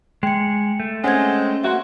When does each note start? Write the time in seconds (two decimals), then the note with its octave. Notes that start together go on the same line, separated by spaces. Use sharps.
0.23 G#3 G#4 G5 C#7
0.80 A3
1.04 G#3 C4 C#4 F#5 G#6
1.64 A#3 F#4 E5 C6